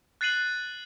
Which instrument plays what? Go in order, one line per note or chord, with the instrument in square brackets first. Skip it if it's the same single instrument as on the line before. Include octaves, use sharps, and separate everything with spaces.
[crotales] F#6 A6 C7 D#7 F#7